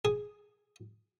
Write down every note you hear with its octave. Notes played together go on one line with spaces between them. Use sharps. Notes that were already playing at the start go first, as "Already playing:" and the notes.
G#4